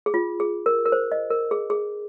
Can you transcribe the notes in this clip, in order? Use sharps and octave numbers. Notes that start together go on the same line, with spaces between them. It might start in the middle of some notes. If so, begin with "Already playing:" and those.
G#4
F4
G#4
A#4
A#4
C5
D#5
A#4
G#4
G#4